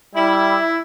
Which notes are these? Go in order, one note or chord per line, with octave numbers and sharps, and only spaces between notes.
G3 E4